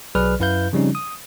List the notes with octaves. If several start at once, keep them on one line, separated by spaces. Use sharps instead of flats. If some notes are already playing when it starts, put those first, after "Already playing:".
B1 F#3 G#4 B4 D5 F6
F#2 E4 B4 F5 G6
C#3 F3 G3 C4 C#4 D#4
D#6